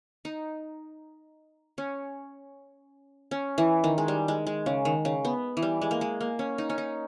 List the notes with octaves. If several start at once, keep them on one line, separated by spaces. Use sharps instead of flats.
D#4
C#4
C#4
E3
D#3
G#3
G3
G#3
G#3
C#3
D#3
C#3
B3
E3
G3
G#3
A#3
G#3
A#3
C#4
D#4
C#4
D#4